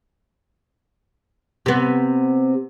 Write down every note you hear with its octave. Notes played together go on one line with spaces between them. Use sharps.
C3 B3